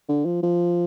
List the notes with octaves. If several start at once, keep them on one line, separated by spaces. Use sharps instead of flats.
D3
F3
F3